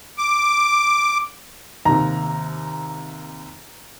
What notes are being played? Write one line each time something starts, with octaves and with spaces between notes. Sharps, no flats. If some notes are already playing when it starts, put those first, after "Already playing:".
D6
D#2 C3 A#5